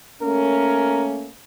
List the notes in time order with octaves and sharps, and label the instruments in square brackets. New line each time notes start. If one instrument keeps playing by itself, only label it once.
[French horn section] A3 A#3 C#4 [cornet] A#4